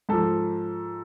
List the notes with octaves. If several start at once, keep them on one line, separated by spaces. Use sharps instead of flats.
G#2 F3 A4